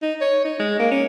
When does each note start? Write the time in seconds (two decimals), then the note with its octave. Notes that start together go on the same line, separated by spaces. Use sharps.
0.02 D#4
0.21 C#5
0.45 D#4
0.60 G#3
0.79 A#3
0.91 C#4